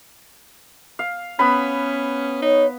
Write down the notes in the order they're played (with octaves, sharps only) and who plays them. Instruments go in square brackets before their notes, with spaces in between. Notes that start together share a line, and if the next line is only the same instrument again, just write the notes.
[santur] F5
[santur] B3 B5 [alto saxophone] C#4
[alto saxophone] D#4 [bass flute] C#5